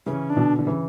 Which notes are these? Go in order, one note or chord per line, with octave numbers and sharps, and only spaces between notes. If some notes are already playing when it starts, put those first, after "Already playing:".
C#3 E3 C#4
D4
B2 D3
D3
C#3 E3